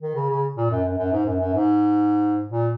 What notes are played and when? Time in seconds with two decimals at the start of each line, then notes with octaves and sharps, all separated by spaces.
0.02 D#3
0.15 C#3
0.30 C#3
0.56 A#2
0.71 F#2
0.85 F#2
0.98 F#2
1.12 G#2
1.25 F#2
1.40 F#2
1.53 G#2
2.50 A#2